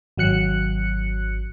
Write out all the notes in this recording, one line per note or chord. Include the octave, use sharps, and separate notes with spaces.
G#1 F#3 F#6 C#7